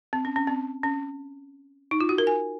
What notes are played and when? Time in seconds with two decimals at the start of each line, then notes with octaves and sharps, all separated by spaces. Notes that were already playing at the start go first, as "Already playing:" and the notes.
0.13 C4
0.25 C#4
0.36 C#4
0.47 C4
0.83 C#4
1.91 D#4
2.01 F4
2.09 F#4
2.18 A#4
2.27 G#5